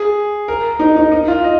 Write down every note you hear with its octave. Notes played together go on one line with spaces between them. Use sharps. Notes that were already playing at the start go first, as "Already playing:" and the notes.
Already playing: G#4
A#4
D#4
D#4
D#4
F4
D#5